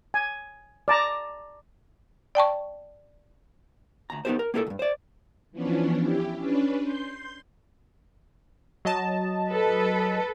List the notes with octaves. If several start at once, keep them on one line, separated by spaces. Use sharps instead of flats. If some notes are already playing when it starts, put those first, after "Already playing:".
G#5
D5 A5 A#5
D5 G5 A5 C#6
D2 A#5
B3 D#4 F4 G4 A#4 C5
A#4
A#3 B3 E4 G4 A4 A#4
C#2 G2
C5 D5
E3 F3 B3 C#4 D4
E4 G4
C#4 D4 B4
C6 G6
F#3 D#5 A5
A4 B4